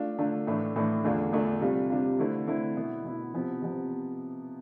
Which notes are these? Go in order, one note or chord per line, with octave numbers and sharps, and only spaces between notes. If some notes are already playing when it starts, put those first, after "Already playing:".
Already playing: A3 D4 F4
D3 A3 D4 F4
A2 E3 A3 D4
A2 E3 A3 D4
E2 D3 A3 D4 F4
E2 D3 A3 D4 F4
C3 G3 D4 F4
C3 G3 D4 F4
D3 A3 C4 E4
D3 A3 C4 E4
B2 B3 E4
B2 B3 E4
C3 F3 B3
C3 F3 B3